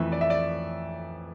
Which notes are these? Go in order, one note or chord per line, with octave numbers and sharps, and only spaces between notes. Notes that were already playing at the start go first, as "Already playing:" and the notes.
Already playing: F2 E3 A3 E5
D5
E5
D5